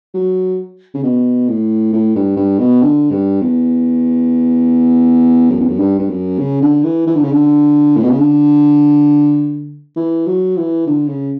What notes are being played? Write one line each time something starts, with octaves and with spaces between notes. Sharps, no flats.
F#3
C#3
B2
A2
A2
G2
G2
B2
D3
G2
E2
F#2
E2
F#2
G2
G2
F#2
C#3
D3
E3
E3
D3
C#3
D3
A2
B2
C#3
D3
E3
F#3
E3
D3
C#3